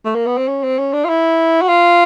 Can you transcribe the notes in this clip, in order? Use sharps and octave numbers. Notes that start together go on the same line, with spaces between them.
A3
A#3
B3
C4
C#4
C4
C#4
D4
F4
E4
F#4
F4